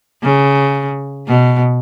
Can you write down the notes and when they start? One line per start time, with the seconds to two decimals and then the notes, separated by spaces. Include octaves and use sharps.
0.23 C#3
1.28 B2